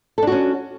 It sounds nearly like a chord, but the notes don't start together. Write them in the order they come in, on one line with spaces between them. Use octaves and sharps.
A4 D4 F#4 C#4